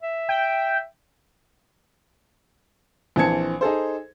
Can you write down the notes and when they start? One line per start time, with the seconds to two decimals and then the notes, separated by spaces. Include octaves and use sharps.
0.03 E5
0.29 G5
3.16 A#1 E3 C4 A5 G#6 C#7
3.61 D#4 G#4 A4 C5